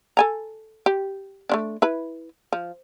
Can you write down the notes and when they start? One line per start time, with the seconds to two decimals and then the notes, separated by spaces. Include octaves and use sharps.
0.17 A4 G#5 A#5
0.86 G4
1.49 A3 C#4 D4
1.82 E4 B4 B5
2.53 F3